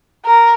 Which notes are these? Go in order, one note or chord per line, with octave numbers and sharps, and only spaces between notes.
A#4